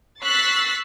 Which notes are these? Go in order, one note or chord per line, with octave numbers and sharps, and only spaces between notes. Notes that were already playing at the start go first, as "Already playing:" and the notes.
C#6 E6 F#6 A6 B6 C7